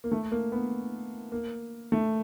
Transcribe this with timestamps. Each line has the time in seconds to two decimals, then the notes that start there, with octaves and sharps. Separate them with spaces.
0.04 A#3
0.12 A3
0.32 A#3
0.52 B3
1.32 A#3
1.92 A3